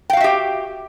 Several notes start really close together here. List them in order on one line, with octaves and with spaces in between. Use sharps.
G5 F5 F#4 E5 G4